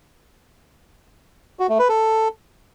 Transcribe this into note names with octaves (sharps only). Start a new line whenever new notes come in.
F#4
A3
B4
A4